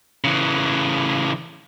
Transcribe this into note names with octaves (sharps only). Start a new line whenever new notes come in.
C#3 E3